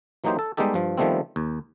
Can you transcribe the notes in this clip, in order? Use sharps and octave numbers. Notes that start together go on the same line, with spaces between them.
E3 F#3 A#3 D#4 G4 C5
A4
G3 G#3 B3 D#4 G4 A4
G2 F3
D#3 F3 G3 A3 B3 C4
D#2